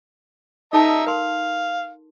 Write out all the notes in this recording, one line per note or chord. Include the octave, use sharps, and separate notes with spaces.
D#4 A4 D#5 E5 A5 A#5
A#4 F5 C6